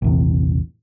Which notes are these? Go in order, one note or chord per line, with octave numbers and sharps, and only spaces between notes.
A#1 E2 C3